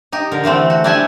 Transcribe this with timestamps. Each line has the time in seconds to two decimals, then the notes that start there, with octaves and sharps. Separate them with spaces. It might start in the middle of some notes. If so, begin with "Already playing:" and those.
0.12 D#4 G4
0.32 D3 A#4
0.44 D3 E3 A3 C4
0.70 F#4
0.84 D4 E4 G4 E5 F#5 G#5